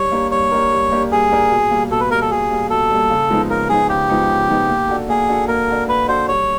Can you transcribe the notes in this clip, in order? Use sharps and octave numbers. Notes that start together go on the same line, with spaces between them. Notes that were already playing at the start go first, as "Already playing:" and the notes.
Already playing: G3 C#5
A#3 D4 G4 A#4
G3 C#5
A#3 D4 G4 A#4
G3
A#3 D4 G4 A#4
G3 G#4
A#3 D4 G4 A#4
B2
G3 A#3
B2 A4
B4
G3 A#3 A#4
A4
B2 G#4
G3 A#3
B2 A4
G3 A#3
C#3
F3 G#3 B3 D#4
C#3 A#4
F3 G#3 B3 D#4 G#4
C#3 G4
F3 G#3 B3 D#4
C#3
F3 G#3 B3 D#4
A#3
D4 F#4 A4
A#3 G#4
D4 F#4 A4
A#3 A#4
D4 F#4 A4
A#3 B4
D4 F#4 A4 C5
G3 C#5